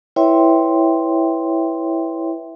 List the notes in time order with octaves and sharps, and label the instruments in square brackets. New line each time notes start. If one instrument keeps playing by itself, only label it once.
[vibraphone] E4 B4 C#5 E5 G5 C6